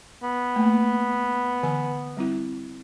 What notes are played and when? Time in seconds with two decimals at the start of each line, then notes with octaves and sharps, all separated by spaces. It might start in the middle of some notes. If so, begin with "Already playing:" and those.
0.23 B3
0.56 A3 A#3
1.63 D3 E3 G#5
2.17 G3 C4 E4